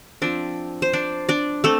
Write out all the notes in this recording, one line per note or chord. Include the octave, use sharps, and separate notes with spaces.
F3 C4 D4 D5
C5
D4 D5
D4 D5
A3 C4 A4